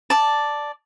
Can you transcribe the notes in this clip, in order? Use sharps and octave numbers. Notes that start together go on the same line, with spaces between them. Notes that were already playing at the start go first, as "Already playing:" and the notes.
D5 A5